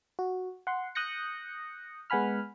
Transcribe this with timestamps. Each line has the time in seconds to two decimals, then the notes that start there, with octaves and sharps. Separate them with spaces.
0.19 F#4
0.67 F#5 C6
0.95 D#6 F#6 G6 A#6 C#7
2.10 G#3 B3 F#5 G#5 B5 F6